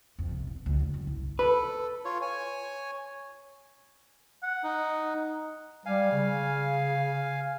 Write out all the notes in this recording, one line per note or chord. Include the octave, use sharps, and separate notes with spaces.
F2
C3
E2
D2
D2
F#2
C2
A4 B4
F4 C#5
C#5 G#5
F#5
D#4
G3 F5 G#5
C#3